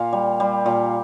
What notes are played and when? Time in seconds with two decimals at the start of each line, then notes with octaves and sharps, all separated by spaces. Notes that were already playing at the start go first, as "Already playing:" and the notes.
Already playing: A#2 F5
0.13 G3
0.40 G3
0.66 A#2